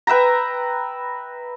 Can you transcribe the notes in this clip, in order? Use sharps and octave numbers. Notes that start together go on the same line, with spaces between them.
B4 E5 G5 A#5